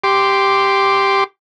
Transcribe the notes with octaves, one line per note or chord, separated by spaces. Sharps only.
G4 C6 D6